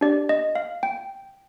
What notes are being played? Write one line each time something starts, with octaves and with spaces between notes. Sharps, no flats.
D4 G4 D5
D#5
F5
G5